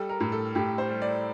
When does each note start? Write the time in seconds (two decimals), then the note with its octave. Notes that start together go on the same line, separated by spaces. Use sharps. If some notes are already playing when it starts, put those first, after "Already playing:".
Already playing: G3 A4
0.09 A#4
0.20 A2
0.32 A4
0.55 A2 G4
0.78 C5
0.90 G3
1.02 D5